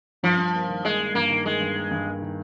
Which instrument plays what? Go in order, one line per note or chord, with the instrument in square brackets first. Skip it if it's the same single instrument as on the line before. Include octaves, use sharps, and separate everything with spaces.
[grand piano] G2 [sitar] F3
[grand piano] G2
A#3
D#3
[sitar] G#3 [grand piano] A#3
[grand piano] A#3
[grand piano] G2 [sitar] A#3
[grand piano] D#3
[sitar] G#3 [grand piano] A#3
[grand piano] G2
A#3
G2
A#3
D#3